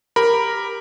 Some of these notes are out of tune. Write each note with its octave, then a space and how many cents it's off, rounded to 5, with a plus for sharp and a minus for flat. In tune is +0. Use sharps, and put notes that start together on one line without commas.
G4 +10 A#4 +0 B5 +0